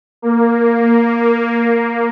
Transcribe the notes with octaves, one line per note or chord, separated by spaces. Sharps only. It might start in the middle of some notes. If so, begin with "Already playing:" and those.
A#3